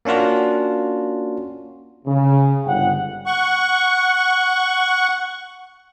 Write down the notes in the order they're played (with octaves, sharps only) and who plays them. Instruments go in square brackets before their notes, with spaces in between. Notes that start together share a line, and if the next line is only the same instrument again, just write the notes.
[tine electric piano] A#3 C#4 D4 F4 F#4
[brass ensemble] C#3
G1 G#2 F#5 G5
[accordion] F#5 C#6